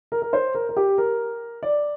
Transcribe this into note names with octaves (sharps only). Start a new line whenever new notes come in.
A#4
A#4
C5
A#4
A#4
G4
A#4
D5